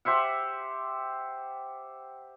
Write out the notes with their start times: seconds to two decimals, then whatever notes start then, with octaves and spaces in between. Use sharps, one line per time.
0.05 G4 C5 E5 F#5